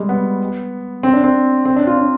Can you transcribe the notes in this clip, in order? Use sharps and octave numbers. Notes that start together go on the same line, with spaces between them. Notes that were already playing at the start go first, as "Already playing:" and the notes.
Already playing: G3 G#3
B3
C4
D4
C4
C4
D4
F4
D4